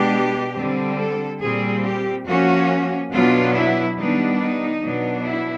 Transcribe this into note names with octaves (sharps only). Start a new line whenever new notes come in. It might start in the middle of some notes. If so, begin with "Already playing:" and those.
Already playing: B2 G#3 B3 D4 G4
D3 G3 C4
A4
A#2 G3 C4 G#4
G4
F3 A#3 C#4 F#4
B2 F#3 B3 D4 F4
E4
D#3 G3 B3 D4 D#4
D#4
B2 F#3 B3 D4
E4